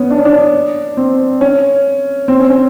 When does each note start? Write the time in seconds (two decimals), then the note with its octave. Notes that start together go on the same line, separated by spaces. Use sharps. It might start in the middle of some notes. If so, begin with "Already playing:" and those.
Already playing: B3 C#4
0.10 D4
0.18 C#4
0.25 D4
0.97 C4
1.41 C#4
2.28 C4
2.40 C#4
2.50 C#4